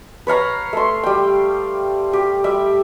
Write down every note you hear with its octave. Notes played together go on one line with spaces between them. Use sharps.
B4 C#5 F5 A#5
A3 C6
G3 G5
G4
G3 E5